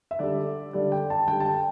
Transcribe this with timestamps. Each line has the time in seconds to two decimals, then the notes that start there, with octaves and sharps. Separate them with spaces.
0.11 E5
0.19 D3 G3 D5
0.73 D3 G3 D5
0.92 G5
1.10 A5
1.28 D3 G3 G5
1.40 A5
1.46 G5